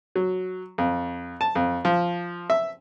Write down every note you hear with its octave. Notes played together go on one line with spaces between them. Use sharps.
F#3
F2
A5
F2
F3
E5